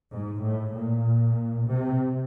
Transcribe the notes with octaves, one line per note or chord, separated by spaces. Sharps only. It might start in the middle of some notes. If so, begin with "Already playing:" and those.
G#2
A2
A#2
C3